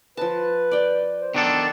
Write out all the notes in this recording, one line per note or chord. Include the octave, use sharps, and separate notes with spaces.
F3 B4 A5
D5 G5
C5
D#3 B3 D4 A4